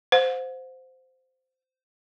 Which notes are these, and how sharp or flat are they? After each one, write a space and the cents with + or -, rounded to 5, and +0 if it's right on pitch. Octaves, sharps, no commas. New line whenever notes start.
C5 -15 F#5 -45